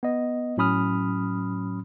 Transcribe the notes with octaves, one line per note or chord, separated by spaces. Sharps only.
B3 D#5
A2 F#3 C#4 B5 D#6 F6